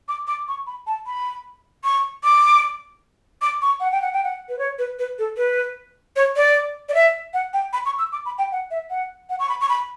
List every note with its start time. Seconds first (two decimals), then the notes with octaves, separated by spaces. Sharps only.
0.08 D6
0.27 D6
0.48 C#6
0.67 B5
0.87 A5
1.07 B5
1.84 C#6
2.24 D6
3.42 D6
3.62 C#6
3.80 F#5
3.92 G5
4.02 F#5
4.13 G5
4.24 F#5
4.49 B4
4.59 C#5
4.79 B4
4.99 B4
5.19 A4
5.37 B4
6.16 C#5
6.36 D5
6.89 D5
6.94 E5
7.34 F#5
7.53 G5
7.73 B5
7.86 C#6
7.98 E6
8.12 D6
8.26 B5
8.38 G5
8.52 F#5
8.71 E5
8.90 F#5
9.30 F#5
9.39 C#6
9.49 B5
9.61 C#6
9.69 B5